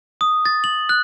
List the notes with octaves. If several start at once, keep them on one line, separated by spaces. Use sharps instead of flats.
D#6
A6
F#7
F#6